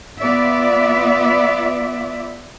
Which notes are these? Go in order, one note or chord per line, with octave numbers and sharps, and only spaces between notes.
B3 F4 D5 E5